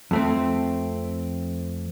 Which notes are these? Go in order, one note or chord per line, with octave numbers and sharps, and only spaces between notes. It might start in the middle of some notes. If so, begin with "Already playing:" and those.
F2 A3 C4